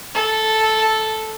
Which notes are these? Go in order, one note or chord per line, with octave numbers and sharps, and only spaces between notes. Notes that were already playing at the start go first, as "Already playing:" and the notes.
A4